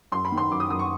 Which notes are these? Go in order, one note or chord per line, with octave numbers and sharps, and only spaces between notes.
F#2 C6
B5
D#3
C6
F#2 D6
D#6
F#2 D#6
C#6